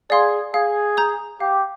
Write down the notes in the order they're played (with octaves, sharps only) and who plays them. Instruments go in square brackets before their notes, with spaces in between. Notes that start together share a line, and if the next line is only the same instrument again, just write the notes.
[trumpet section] G#4 [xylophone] D5 F5 C6
[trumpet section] G#4 [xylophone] F5
[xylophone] A#5 D#6 G6
[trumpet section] G4 [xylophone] F5